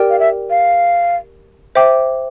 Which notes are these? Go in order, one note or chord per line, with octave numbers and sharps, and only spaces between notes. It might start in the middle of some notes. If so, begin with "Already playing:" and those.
Already playing: G4 A#4 D5 G5
F5
E5
F5
C5 E5 G5 D6